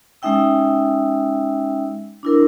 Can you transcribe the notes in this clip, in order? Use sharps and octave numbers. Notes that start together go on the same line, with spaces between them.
G#3 C#4 D#4 E5 G5 E6
D4 E4 A#4